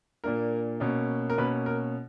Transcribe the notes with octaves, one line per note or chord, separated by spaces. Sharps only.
A#2 A#3 D4 A#4
B2 A#3 C#4
A#4
B2 A#3 C#4 B4
A#4